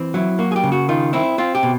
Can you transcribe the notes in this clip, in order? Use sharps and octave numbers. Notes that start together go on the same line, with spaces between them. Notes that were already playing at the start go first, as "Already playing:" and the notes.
Already playing: E3 C4
F#3 E4
A#3 F#4
G#4
G4
C#3
F#4
D#3 F4
C4 E4
C4 F4
G4
B2